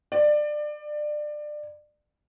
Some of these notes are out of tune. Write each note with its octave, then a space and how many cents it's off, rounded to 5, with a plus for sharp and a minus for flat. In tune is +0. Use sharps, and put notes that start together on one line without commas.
D5 +25